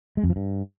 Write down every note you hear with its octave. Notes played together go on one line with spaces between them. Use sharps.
G#3
F2
F3
G2